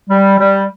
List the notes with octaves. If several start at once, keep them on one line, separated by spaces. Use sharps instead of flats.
G3
G3